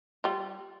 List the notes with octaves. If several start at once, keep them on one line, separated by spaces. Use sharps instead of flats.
G3 F4